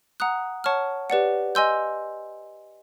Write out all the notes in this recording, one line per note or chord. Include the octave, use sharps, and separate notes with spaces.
F#5 A#5 D#6 F#6
C#5 F#5 A5 C#6 F6
G4 B4 D5 F#5
D#5 G#5 C6 E6 G6